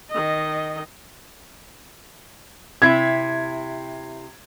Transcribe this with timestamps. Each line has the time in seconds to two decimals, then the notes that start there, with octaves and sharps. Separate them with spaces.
0.10 D#3 D#5
2.82 C3 E4 G#6